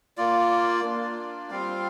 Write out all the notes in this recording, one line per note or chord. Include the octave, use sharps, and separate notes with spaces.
A#3 F4 D5
A#3 D4 F4
G3 C4 F4 F5